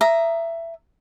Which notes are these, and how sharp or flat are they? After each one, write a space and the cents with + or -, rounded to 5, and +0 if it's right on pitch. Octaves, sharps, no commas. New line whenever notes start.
E5 +15 A#5 +0 D#6 +0